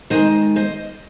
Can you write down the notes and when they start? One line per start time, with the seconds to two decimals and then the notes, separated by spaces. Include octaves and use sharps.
0.10 D#3 G#3 C5 D#5
0.56 C5 D#5